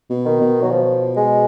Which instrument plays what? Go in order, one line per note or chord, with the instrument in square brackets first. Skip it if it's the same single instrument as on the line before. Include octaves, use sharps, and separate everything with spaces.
[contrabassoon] B2
[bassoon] D#3
[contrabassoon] B2
[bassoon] F#3
F3
G#3